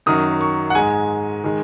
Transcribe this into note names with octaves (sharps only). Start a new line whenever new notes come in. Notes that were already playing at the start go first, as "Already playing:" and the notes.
F#2 D#3 F#3 D#6
C#6
F#5
G#2 G#3 G#5
D#3 G#3